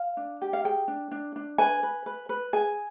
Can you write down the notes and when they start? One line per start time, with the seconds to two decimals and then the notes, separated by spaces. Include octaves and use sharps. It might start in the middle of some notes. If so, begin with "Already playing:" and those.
Already playing: F5
0.17 D4
0.42 G4
0.53 F5
0.64 G#4 G5
0.88 D4
1.11 D4
1.36 D4
1.58 B4 G#5
1.83 B4
2.06 B4
2.29 B4
2.53 G#4 G#5